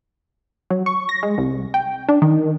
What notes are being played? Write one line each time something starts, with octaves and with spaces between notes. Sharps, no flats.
F#3
C#6
A#6
G#3
C2
G5
D4
D#3